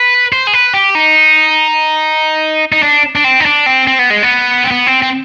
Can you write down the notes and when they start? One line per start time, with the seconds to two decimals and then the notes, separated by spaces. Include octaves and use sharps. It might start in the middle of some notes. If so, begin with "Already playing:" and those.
Already playing: B4
0.33 C5
0.47 G#4
0.53 B4
0.73 G4
0.95 D#4
2.72 D#4
2.83 D4
3.15 D4
3.24 C4
3.40 D#4
3.46 D4
3.66 C4
3.87 C4
3.99 B3
4.10 G#3
4.23 B3
4.64 C4
4.71 B3
4.87 C4
5.02 C4